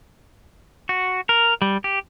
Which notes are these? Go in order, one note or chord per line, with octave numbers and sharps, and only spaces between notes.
F#4
A#4
G3
G4